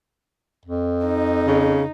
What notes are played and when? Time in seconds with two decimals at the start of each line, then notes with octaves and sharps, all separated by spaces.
0.66 F2
1.06 D#4
1.47 C#3